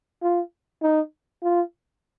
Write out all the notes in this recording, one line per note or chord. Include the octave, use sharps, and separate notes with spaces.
F4
D#4
F4